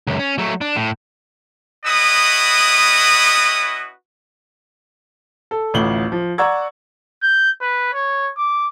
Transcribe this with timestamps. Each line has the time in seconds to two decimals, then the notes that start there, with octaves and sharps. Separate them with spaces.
0.07 C#2 F#2
0.19 C#4
0.38 F#3 A3
0.61 D4
0.76 A2
1.85 C#4 E4 F#4 B4 D#5 D#6
5.51 A4
5.74 A1 D2 A2 F4 F#7 G7
6.12 F3
6.38 D5 F#5 A#5 C#6 E6 G#6
7.23 G6
7.61 B4
7.93 C#5
8.37 D6